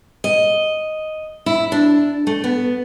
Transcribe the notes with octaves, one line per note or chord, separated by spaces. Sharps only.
D#5
E4
D4
A3
B3